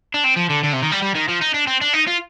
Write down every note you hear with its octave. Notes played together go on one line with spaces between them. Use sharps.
D4
C4
F3
D3
D3
C3
D#3
G3
G3
D#3
F3
D#4
D4
C4
D4
D#4
F4